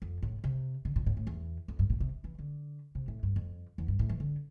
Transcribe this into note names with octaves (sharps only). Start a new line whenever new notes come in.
F2
A2
C3
D3
A#2
A2
A2
E2
F2
G2
A#2
C3
E3
D3
C3
A2
G2
F2
E2
G2
A2
E3
D3